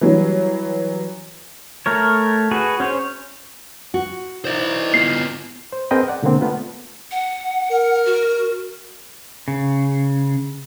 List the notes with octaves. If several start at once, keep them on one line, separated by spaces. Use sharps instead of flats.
E3 F#3 G3
A3 A#4 C#5
F#4 G#4 B4
C#4 C5 C#5
F#4
E3 D#4 E4 C5 D5
B3 F4 C7
C5
C4 G#4 A#4 B4 D#5 G5
D5 F#5
B2 D3 G#3 A#3 C4
A3 B3 F4
F#5
A#4
F#4
C#3